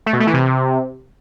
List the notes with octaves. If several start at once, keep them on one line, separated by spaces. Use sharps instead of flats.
A3
B2
A3
E3
C3